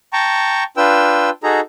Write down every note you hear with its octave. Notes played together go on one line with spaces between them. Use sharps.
G5 A5 A#5 C#6
D4 F4 B4 G5 E6
D#4 F#4 G#4 A4 A#5